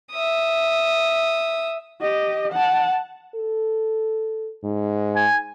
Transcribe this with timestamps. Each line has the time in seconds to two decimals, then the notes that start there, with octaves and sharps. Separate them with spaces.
0.11 E5 D#6
2.01 G4 D#5
2.52 F#5 A5
3.35 A4
4.64 G#2
5.15 G#5